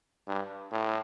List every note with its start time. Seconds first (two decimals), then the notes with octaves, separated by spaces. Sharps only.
0.27 G2
0.72 A2